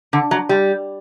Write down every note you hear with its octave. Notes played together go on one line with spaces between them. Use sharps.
D3
F#3
G3